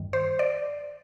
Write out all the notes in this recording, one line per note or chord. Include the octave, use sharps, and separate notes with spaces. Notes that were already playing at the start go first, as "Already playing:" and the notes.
Already playing: G2 D#3 G3
C5
D5